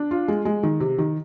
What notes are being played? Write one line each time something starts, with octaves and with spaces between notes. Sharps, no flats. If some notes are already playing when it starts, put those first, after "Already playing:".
Already playing: D4
F4
G#3
G#3
D#3
C3
D#3